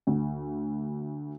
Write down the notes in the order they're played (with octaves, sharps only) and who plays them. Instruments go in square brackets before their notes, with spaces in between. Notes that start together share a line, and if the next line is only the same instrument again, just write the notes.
[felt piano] D2